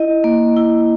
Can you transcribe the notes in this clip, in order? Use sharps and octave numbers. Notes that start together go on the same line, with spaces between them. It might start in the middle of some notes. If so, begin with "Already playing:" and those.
Already playing: E4 D#5
A#3
E4